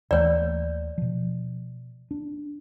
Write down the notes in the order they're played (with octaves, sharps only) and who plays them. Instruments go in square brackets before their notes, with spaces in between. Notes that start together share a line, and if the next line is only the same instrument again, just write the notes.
[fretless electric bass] D#2 E3 A3 [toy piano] C#5 D5
[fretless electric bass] B2 F3
D4